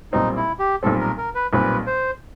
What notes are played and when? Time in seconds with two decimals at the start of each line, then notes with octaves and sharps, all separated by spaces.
0.12 B1 A#2 G3 C4 D#4
0.36 E4
0.59 G4
0.82 B1 A#2 G3 C4 A4
1.00 A#4
1.17 A#4
1.35 B4
1.53 B1 A#2 G3 C4 B4
1.87 C5